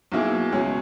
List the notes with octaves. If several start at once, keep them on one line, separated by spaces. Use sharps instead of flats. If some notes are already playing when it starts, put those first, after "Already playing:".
B1 B2 A#3 E4 G#4
C#2 B2 G#3 C#4